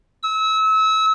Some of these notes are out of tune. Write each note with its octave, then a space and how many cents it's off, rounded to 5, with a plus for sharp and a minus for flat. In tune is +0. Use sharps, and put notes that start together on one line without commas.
E6 -30